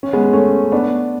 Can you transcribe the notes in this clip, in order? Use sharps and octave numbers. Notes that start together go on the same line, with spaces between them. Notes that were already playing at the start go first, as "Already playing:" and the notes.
C#4
G#3 B3
A3 C#4
B3 D4